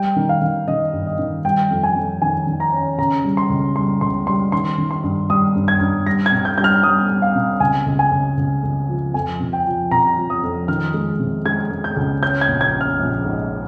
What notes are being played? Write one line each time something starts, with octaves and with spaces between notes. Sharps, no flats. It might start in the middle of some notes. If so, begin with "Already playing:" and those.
Already playing: G3 G5
D#3
F5
D#3
D#3 D#5
G2
D#5
D#3
G3 G5
F2
G#5
F2
D#3 G#5
D#3
A#5
C#4
C#3 A#5
G3
C6
C#2
G3 C6
C#2 C6
G3 C6
D#3 C6
D#3
C6
G2
G3 D#6
G2
G#6
G2
G3 A#6
G#6
C3
G6
G3 G6
F6
G3 D#6
G3
F5
C3
C#2 G#5
C#2
G#5
C#2
C#2
C#2
F3
F2 G#5
C3
G5
F3
C3 A#5
F3
D#6
F2
D#3 F6
G#3
C3
G#3 G#6
G#3
G6
C#2
C#4 G6
G#6
A#1
G#6
C#4
F6
A#1
G#2